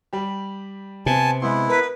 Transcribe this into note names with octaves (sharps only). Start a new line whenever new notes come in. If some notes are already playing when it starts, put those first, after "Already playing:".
G3 G4
C3 B3 C4 G#5 A5
G#3 B3 E4 C6
A#4 B4 A#5